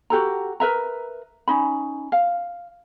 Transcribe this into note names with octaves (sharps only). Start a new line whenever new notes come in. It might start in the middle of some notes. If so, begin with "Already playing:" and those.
F#4 G4 A4 A#5
A#4 B4 E5 A#5
C#4 D#4 B5
F5